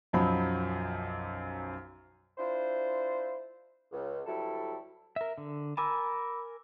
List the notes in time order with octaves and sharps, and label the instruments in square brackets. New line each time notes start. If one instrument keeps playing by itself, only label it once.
[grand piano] B1 F#2 F3 F#3 B5
[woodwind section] D4 E4 F4 C5
C#2
D2 F#3 G3 E4 A4
[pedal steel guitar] A#4 E5
D3
[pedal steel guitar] A#4 G#5 A5 [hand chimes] B5 D6 E6